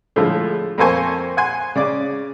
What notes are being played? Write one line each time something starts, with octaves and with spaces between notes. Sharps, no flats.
A2 D3 F3 G#3
F2 A#3 A4 C5 G#5 C#6
F#5 G#5 C6
C#3 D5 D6